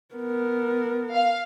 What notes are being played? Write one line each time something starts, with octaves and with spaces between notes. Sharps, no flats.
B3 A#4
F5